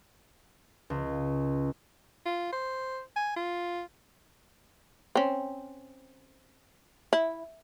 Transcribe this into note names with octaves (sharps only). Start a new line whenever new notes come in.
C#2
F4
C5
G#5
F4
C4 C#4
E4